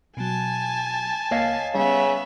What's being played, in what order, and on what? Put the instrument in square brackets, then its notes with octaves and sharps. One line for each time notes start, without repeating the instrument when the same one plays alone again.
[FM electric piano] B2 F#3 [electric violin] G#5 A5
[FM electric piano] A#3 [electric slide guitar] C#5 D#5 F5
[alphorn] C#3 [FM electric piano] G3 C#4 [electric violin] B3 E5